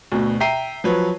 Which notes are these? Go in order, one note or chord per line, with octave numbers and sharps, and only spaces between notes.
D2 B2
E5 G5 A#5 C7 D#7
F3 F#3 B4 C#5